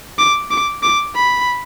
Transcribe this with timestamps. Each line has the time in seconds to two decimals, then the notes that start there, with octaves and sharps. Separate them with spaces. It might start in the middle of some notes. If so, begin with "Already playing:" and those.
0.18 D6
0.51 D6
0.83 D6
1.16 B5